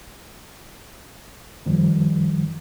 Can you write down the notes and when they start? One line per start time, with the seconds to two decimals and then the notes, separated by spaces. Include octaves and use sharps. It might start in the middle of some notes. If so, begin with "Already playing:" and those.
1.66 F#2 D#3 F3 G3